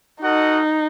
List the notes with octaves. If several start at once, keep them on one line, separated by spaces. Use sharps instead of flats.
D#4 F#4 A4 D#5 F#5